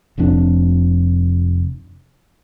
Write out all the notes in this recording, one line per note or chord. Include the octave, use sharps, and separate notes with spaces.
F1 F2 C3 D4